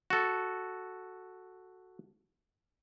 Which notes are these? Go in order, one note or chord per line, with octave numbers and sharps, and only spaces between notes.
F#4 A4